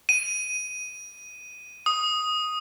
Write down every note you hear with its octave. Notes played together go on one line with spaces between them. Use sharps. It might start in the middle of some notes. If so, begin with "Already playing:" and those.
D#7
D#6